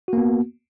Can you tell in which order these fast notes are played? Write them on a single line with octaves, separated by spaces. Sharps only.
F#4 A#3 B3